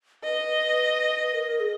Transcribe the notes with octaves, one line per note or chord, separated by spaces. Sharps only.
B4 D#5
A#4
G#4